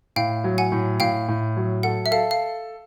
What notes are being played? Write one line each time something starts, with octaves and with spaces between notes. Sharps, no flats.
A2 F5 G5
F#3
F#5 G#5
A2
A2 F5 G5
A2
F#3
A4 F#5
E5
A4 F5
F5